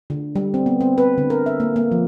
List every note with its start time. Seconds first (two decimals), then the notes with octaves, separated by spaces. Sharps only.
0.10 D3
0.35 G3
0.54 C4
0.66 B3
0.81 C4
0.98 B4
1.18 D3
1.30 A#4
1.46 E5
1.60 A#3
1.76 A#3
1.92 F3